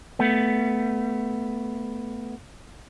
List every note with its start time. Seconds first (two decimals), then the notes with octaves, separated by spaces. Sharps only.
0.19 A3 B3